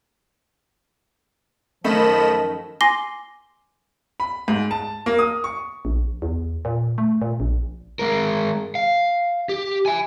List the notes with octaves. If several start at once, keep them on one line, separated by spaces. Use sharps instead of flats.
F#2 D#3 F3 A3 B4 D#5 B5 E7
G#5 C6 D6 A#6 C7 G7
B5
G#2
A5
A#3
D#6
C#6
A#1
E2
A#2
A3
A#2
A#1
G#3 A#4
F5
G4
E5 G#5